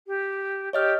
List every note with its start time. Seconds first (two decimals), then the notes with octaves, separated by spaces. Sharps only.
0.06 G4
0.73 G4 C#5 D#5 F6